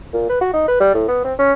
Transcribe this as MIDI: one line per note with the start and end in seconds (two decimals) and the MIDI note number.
0.13 0.27 46
0.29 0.37 71
0.41 0.49 66
0.54 0.63 63
0.68 0.78 71
0.80 0.92 55
0.94 1.05 45
1.08 1.20 59
1.24 1.33 60
1.39 1.53 61